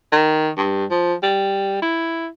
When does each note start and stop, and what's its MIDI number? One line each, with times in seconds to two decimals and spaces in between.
0.12 0.49 51
0.57 0.85 43
0.91 1.14 53
1.23 1.82 55
1.82 2.27 64